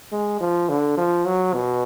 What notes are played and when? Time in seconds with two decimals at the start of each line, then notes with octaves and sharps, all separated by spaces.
0.12 G#3
0.41 F3
0.69 D3
0.97 F3
1.26 F#3
1.54 B2